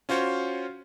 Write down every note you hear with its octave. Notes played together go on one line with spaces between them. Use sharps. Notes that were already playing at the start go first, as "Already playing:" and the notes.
C#4 F4 F#4 C5 C#5